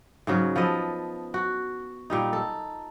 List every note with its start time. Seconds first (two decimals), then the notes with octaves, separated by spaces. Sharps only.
0.27 G#2 C#3 F#3
0.56 F3 B3 A4 D#5
1.34 F#4
2.10 A#2 G3 D#4
2.33 A4